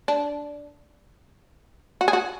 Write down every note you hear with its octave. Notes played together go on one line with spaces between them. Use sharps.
D4
F#4
G#4
F#4